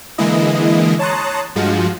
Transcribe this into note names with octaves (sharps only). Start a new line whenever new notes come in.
D3 E3 G#3 A#3 E4 D#5
C#5 A5 A#5 C6 D#6 F#6
G2 F3 G#3 F4 F#4